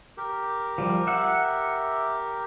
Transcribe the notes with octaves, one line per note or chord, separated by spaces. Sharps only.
G4 A#4
F3 G3
E5 F#5